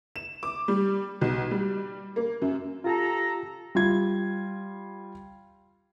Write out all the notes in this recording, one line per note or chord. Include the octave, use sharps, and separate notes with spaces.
E7
D6
G3
B1
G3
A#3
F#2
F4 G4 A4 A5 A#5
G3 F4 G#6